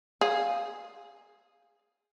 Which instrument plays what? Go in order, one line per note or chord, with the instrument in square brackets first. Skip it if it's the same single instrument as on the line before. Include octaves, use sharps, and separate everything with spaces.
[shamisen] G#4 [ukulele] F5